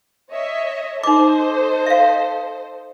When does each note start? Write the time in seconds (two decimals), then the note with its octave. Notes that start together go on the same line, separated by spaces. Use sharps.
0.31 C#5 D#5 E5
1.03 D#4 A4 C5 D#5 D6
1.86 E5 F5